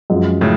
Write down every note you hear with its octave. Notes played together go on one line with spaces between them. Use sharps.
F#2 F3 G#3
A2 C#3